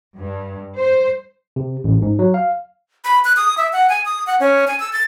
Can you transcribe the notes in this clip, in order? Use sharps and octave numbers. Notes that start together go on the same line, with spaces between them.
G2
C5
C3
A1
G#2
F#3
F5
B5
F#6
D#6
E5
F#5
G#5
D#6
F#5
C#4
G#5
E6
A6